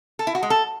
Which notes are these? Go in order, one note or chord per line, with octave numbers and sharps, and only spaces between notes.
A4
E4
F#4
G#3
A4